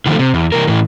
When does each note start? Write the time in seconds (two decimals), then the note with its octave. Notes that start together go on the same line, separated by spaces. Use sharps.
0.06 D3 D#3 F3 F#3 A3
0.19 C3
0.34 E2
0.52 C3 E3 A#3 A#4
0.67 A2 E3